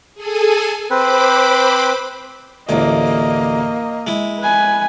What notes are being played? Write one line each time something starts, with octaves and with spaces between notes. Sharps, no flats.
G#4 A4 G#5
C4 B4 C5 B5 D6
A1 D2 A#3 D#5
G#3 E4
B4 G#5